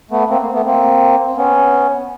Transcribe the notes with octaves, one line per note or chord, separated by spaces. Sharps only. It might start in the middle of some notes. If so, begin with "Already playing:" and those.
A3 B3
A#3 C4
A#3
A3 B3
A#3 C4
C4
B3 C#4